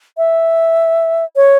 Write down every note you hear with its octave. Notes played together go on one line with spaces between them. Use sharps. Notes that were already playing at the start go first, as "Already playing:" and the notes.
E5
C#5